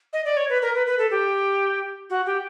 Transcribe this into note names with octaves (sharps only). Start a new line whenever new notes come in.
D#5
D5
C#5
B4
A#4
B4
B4
A4
G4
F#4
G4